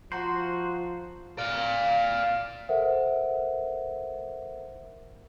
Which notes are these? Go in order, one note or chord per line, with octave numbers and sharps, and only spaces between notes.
F3 F#4 C5 F#5 A#5 C6
D5 F5
A4 A#4 C5 E5 F#5